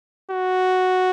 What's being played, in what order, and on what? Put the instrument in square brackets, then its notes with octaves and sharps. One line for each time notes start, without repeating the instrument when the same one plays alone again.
[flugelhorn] F#4